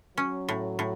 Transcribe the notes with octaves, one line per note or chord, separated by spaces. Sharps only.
F#3 C#4
A2
A2